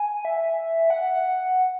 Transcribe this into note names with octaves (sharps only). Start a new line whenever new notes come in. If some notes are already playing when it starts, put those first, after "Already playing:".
Already playing: G#5
E5
F#5